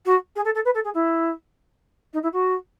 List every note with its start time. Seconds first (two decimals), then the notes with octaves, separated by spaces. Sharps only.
0.05 F#4
0.35 G#4
0.45 A4
0.55 A4
0.65 B4
0.74 A4
0.84 G#4
0.94 E4
2.13 D#4
2.22 E4
2.32 F#4